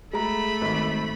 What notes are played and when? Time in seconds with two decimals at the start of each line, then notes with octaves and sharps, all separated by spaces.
0.13 G#3 A3 A#5 B5
0.62 G#1